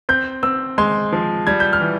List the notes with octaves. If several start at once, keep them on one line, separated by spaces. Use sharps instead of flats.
C4 G6
C4 E6
G#3 C6
F3
G3 G#6
G6
F6
E3